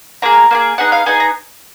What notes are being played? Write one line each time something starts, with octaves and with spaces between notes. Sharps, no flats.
A#3 F4 G#4 A#5
A#3 F4 G#4
B3 D#4 G#4 F#5
F5
B3 D#4 G#4 G#5
A#5